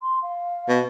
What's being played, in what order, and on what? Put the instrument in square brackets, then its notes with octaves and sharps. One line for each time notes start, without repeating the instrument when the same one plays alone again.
[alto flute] C6
F5
[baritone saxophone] B2